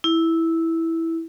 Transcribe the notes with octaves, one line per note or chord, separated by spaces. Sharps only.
E4